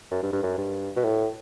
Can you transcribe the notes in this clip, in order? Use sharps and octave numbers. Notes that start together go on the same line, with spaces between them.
F#2
G2
G2
F#2
G2
B2
A2